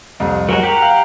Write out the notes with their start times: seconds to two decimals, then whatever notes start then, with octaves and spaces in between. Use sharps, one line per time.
0.20 C2 F2
0.49 F#3 G#3 F#4 A#4
0.63 G4 F#5 A#5
0.82 F5